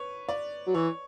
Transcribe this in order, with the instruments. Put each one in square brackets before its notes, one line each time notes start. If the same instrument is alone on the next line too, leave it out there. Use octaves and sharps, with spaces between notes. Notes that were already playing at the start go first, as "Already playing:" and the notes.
Already playing: [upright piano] B4 C#5
D5
[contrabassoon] F#3
[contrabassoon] E3 [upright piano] C#5